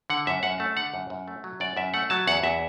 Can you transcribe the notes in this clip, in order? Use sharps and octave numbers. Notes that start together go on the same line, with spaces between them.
D3 F#5
F#2 E5
F#2 F#5
A3 A5
D3 F#5
F#2
F#2
A3
F#3
F#2 D5
F#2 E5
A3 F#5
F#3 A5
E2 F#5
E2 E5